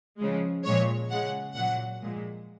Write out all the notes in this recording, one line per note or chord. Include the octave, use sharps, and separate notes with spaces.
C#3 F3 G#3
A#2 F3 G#3 C#5
C#3 G#3 F#5
A#2 F#3 F#5
A#2 F3 G#3